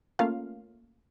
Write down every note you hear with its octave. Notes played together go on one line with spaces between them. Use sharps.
A3 A#3 C#4 F4 F5